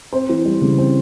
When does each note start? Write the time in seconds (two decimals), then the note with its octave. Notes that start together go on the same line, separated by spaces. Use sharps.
0.13 C4 C5
0.29 E3
0.45 G3
0.62 C#3
0.78 C4